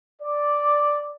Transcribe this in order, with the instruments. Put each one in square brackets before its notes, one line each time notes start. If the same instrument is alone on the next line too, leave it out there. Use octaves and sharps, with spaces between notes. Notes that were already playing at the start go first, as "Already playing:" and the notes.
[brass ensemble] D5